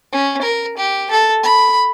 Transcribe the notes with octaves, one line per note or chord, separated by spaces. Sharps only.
C#4
A#4
G4
A4
B5